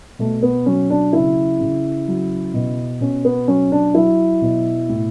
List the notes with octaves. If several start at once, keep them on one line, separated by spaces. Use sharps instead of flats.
B2 A3
B3
F#3 C#4
D4
C#3 E4
C#3
F#3
B2
B2 C#4
B3
F#3 C#4
D4
F#3 E4
B2
A2